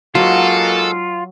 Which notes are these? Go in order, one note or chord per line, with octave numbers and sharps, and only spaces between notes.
G#2 F#3 A#3 F4 F#4 A4